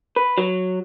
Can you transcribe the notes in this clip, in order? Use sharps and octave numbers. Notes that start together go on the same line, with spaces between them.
B4
F#3